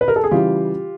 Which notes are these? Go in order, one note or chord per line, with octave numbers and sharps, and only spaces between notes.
B4
A#4
A4
G#4
C#3 E3 G3 F4 G4